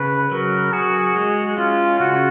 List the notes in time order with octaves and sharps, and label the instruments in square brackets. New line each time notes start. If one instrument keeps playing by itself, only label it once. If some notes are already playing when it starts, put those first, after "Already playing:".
Already playing: [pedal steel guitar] C#3 [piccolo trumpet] B4
[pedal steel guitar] F#3 [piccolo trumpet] A#4
[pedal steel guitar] F#4 [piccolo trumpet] G#4
[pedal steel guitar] G#3
[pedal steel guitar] C#4 [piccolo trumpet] F4
[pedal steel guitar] C#3 [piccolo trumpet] F#4